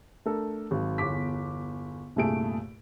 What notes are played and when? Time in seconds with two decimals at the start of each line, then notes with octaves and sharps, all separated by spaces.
0.26 A3 D4 A4 A#4
0.71 G#1 F#3
0.98 G1 E2 D6 B6
2.16 C2 G2 A#2 A3 G#4 D7